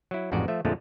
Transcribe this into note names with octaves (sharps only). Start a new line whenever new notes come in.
F#3 E4
A1 F2 G#2 F#4 D5 D#5
F3 A3 E5
F2 A#2 D3 F3 G#3 A3